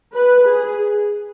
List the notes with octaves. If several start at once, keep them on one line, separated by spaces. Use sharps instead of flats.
B4
G#4